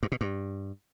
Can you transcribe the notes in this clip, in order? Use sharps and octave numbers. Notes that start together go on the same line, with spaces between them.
G2
B2
G2